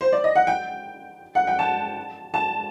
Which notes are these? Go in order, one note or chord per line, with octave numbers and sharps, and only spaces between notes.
C5
D5
D#5
F#5
G5
F#5
G5
A5
A5